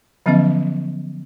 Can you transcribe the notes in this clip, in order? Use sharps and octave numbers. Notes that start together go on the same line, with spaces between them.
D3 F3 F#3 B3 C#4 D#5